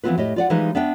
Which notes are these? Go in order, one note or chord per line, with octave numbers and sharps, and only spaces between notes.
E3 F3 B3 C4 F4 B4
A2 G4 D#5
F4 D5 F#5
E3 F3 G3 G#3 D#4 B4
B3 D4 E5 G5